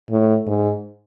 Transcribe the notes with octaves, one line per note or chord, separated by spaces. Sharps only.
A2
G#2